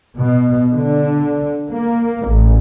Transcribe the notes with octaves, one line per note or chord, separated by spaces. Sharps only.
B2
D3
A#3
A1